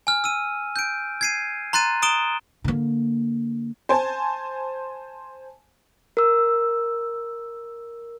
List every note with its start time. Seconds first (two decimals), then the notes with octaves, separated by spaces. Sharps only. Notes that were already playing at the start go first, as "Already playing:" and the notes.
0.07 G#5 F6
0.24 E6 D#7
0.76 G6 D7
1.21 G#6 C7 D#7
1.73 A#5 C6 F#6 A6 D#7
2.02 A#5 D#6 D7 E7 G7
2.64 D3 A#3
3.89 C5 G#5 A5
6.17 A#4 E6